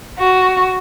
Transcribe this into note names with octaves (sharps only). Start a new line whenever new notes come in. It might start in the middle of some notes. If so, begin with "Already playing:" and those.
F#4